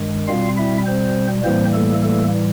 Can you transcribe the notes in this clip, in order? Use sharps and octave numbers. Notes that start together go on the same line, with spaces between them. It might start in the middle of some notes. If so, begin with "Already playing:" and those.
Already playing: G2 D#3 G#3
B2 G3 C4 F4 F5
E4 E5
C4 C5
A2 E3 G3 A#3 C4 C5
A3 A4
A3 A4